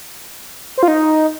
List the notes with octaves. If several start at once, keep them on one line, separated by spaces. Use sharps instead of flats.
C5
F4
D#4